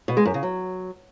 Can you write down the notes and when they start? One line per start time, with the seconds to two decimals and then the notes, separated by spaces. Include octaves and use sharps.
0.08 B2
0.17 G#3
0.25 F#2
0.34 C#3
0.43 F#3